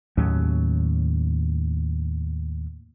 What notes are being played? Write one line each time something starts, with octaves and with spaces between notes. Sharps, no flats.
D#2 A2 F#3 C#4